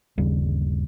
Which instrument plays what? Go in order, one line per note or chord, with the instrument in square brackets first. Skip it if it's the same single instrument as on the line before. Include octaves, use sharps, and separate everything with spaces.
[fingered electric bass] G1 D#2 C#3 G3